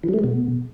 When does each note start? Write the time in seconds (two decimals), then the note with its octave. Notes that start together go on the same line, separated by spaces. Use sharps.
0.03 E3
0.09 F#3
0.14 A3
0.19 G#3
0.24 B2